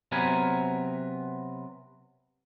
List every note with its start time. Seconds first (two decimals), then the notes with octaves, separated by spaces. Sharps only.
0.12 C3 F#3 B3 A#4 B4 G#5